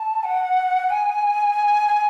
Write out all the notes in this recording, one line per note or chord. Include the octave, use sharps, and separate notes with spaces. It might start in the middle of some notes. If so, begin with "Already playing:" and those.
Already playing: A5
F#5
G#5